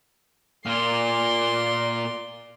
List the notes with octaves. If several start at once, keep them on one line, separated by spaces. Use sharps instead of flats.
A#2 F4 D5 C6